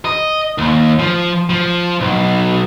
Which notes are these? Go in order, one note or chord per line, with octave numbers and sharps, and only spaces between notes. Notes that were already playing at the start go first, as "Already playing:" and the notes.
D#5
D#2
F3
F3
B1